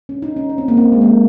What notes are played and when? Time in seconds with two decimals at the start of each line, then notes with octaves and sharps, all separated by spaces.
0.09 C#4
0.22 D#4
0.36 C#4
0.49 C#4
0.58 C4
0.68 A#3
0.77 C4
0.92 G#3
1.01 A#3